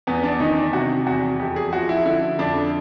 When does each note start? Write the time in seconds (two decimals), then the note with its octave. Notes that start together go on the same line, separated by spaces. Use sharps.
0.07 E2 B3
0.24 D4
0.40 D#3 D#4
0.57 D4
0.73 C3 F#4
1.06 E2 F#4
1.40 F2 G4
1.56 G#4
1.73 F3 F#4
1.89 E4
2.06 D3 E4
2.39 F2 D4